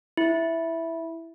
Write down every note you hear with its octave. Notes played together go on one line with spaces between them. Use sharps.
E4